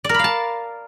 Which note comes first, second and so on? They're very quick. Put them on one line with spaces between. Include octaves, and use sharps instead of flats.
D5 A#4 B5 F5 A5